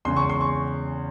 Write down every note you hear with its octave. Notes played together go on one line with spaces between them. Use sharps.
E2 C#3 G#3 C6
C#6
C6
C#6